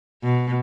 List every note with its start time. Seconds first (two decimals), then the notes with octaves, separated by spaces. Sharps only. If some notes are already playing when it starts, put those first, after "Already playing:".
0.24 B2